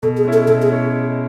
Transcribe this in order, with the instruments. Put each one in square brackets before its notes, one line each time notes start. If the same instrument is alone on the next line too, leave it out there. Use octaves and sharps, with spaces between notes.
[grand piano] B2 [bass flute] A4
[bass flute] G#4
[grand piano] G#3 C#4 E4
[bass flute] A4
[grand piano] B2 [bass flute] A4
[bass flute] G#4
[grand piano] G#3 C#4 E4